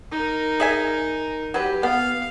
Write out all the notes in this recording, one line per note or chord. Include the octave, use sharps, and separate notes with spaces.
D#4 A#4
G#4 E5 G#5
F#3 G4 B4
B3 F5